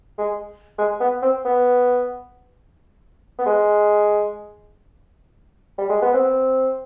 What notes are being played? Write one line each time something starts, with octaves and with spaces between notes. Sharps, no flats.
G#3
G#3
B3
C4
B3
B3
G#3
G3
G#3
B3
C4